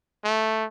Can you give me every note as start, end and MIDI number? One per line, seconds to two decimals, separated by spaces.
0.24 0.65 57